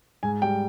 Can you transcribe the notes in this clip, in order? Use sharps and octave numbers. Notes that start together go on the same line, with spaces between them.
G#2 G#5
G3 G5